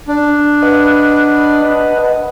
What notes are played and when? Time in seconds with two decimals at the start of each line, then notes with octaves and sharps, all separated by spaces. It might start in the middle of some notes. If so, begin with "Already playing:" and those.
0.08 D4
0.62 B4 D#5 F#5